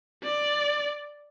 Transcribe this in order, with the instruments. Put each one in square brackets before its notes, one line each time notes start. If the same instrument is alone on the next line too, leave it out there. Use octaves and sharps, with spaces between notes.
[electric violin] D5